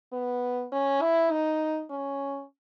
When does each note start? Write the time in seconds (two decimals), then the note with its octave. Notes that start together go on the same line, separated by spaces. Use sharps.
0.13 B3
0.72 C#4
1.02 E4
1.31 D#4
1.90 C#4